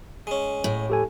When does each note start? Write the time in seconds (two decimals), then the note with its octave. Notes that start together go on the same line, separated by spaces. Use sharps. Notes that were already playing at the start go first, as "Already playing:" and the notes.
0.27 G#3 C#4
0.64 A2
0.90 G4 A4 G#5